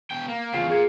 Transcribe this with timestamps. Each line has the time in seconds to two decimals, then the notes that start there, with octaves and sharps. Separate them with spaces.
0.11 B2 G5
0.28 A#3
0.53 E2 C#3 F4 C7
0.69 A#2 G#4 G#6